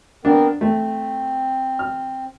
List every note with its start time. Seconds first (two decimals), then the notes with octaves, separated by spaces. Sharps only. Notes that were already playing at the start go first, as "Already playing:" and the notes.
0.25 B3 C4 D4 A#4
0.61 A3 C4
1.79 F6